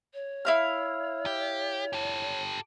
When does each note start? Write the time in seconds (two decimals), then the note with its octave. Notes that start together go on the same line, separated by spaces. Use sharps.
0.14 C#5
0.45 E4 F5 F6
1.26 G4
1.93 G4 A4